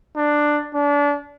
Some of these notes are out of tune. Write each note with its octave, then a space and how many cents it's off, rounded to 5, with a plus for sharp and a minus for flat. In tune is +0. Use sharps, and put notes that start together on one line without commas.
D4 +10
D4 -30